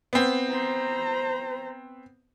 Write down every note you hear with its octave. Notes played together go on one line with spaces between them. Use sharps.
B3 C4
C5 A#5